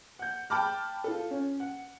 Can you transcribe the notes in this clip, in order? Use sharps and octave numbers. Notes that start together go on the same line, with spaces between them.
F#5 G6
G5 A5 B5 D6 F6
F4 A4
C#4
F#5